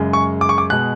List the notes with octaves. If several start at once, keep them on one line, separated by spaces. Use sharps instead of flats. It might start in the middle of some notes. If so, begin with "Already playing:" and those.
Already playing: F#2 C#3 G#3
C#6
D6
C#6
D6
B2 G#3 F#6